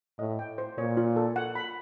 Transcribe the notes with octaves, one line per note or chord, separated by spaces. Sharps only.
A2 D#5
G5
C5
A#2 C#5
F4
A4
F#5
B5